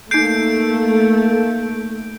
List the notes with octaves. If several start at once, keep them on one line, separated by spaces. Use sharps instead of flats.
A3 A#3 D#4 G6 C7 D7